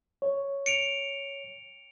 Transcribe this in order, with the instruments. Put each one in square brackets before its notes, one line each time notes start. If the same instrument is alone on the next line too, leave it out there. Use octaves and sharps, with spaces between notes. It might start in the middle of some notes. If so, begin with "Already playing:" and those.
[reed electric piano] C#5
[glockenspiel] C#7 D7 F7